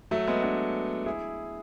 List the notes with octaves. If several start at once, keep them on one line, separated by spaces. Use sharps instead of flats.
F#3 A3
G#3 B3
B3 D4
E4 G#4